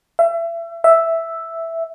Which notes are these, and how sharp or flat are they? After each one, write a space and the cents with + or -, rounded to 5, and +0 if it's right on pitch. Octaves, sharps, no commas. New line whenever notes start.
E5 +30
E5 +0